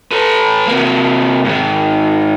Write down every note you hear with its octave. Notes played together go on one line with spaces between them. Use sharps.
A4 B4
C3 A#3
G#2 D#3